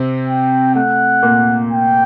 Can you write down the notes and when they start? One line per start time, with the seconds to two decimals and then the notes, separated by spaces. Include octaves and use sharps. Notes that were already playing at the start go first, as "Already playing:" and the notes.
Already playing: C3 C4
0.29 G5
0.75 A3 F#5
1.23 A#2 A#3
1.71 G5